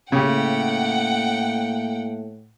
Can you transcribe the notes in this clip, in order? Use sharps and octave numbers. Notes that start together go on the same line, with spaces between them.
A2 C#3 A#3 G4 F#5 G5